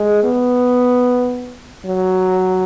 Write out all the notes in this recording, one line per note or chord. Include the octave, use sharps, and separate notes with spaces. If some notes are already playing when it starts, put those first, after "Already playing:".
Already playing: G#3
B3
F#3